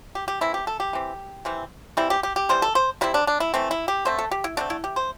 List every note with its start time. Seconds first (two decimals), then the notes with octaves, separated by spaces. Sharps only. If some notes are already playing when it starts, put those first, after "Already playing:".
0.15 G4
0.28 G4
0.41 E3 A3 C4 E4
0.54 G4
0.67 A4
0.80 G4
0.93 E3 C4
1.45 C3 E3 C4
1.97 E3 G3 C4 E4
2.10 G4
2.23 G4
2.36 G4
2.49 C3 E3 G3 C5
2.62 A4
2.75 C5
3.01 C3 G3 C4 E4
3.14 D4
3.27 D4
3.40 E4
3.54 E3 A3 C4
3.71 E4
3.88 G4
4.05 D3 A3 C4 C5
4.19 A4
4.31 G4
4.44 E4
4.57 D3 A3 C4 D4
4.70 E4
4.84 G4
4.96 C5